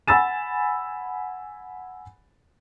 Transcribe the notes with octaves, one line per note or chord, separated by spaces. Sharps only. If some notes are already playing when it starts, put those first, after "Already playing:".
F#5 G#5 B5 E6 A6 E7